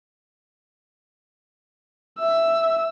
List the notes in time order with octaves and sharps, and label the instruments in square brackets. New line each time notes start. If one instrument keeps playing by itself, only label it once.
[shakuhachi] E5 [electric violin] E6